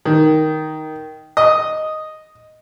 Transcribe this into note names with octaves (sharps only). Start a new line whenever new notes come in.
D#3
D#5